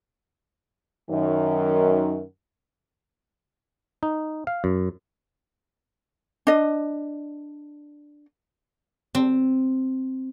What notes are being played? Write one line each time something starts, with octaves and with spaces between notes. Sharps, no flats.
F#2 D#3
D#4
F5
F#2
D4 D#5
C4